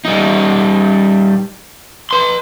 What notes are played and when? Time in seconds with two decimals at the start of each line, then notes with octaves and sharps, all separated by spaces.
0.05 G3 D#4
2.11 B4 C6